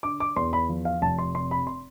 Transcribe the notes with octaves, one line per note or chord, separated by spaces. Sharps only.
D3 D6
D6
E2 C6
B5
F3
F5
F1 A5
C6
C3 C6
B5
C6